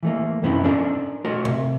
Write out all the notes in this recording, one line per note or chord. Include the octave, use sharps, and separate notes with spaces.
E3 A3 A#3
F#2 C3 B3 C#4 D#4 E4
C#4 D4 A4 A#4
A3 F#4 A#4 C#5
C2 C3